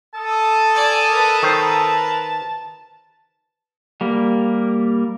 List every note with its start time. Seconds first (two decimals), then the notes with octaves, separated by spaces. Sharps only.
0.14 A4 A5 D#6
0.75 D5 G#5
1.10 A#4 B4
1.43 D#3 C5
4.01 G3 A#3